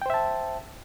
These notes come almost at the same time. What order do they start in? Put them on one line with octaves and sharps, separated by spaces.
G5 C5 E5 A5